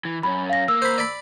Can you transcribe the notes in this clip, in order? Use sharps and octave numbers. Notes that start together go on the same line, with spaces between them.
E3
F#2 C#4 B5
F5 A#6
A#3 E6
C5 B5
D5 B5